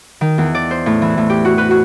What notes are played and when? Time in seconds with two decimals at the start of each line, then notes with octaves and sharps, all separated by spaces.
0.21 D#3
0.38 E2
0.55 D5
0.71 C5
0.86 A2
1.02 E3
1.18 A2
1.30 G4
1.45 F#4
1.58 B4
1.71 F#4